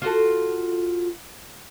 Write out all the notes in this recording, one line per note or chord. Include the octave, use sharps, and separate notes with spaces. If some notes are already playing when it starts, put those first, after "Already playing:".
F4 F#4 A4